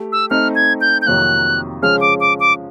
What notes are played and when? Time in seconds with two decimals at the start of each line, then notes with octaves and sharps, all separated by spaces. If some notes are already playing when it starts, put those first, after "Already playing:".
Already playing: A3 G4
0.12 E6
0.30 A3 C4 D#4 F6
0.56 G#6
0.81 G6
1.02 G6
1.06 F2 C3 D#3 F#3 A#3 F#6
1.83 C#3 F3 G#3 C#4 F6
2.01 D6
2.20 D6
2.40 D6